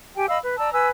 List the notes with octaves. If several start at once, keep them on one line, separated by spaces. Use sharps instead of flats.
G4 G5 G#5
D#5 F5 B5 E6
B4
D5 A5 A#5 E6
B4 G#5 E6